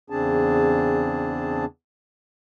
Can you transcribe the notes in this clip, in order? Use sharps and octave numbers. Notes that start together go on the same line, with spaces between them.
E2 C#3 C4 D4 G#4 A5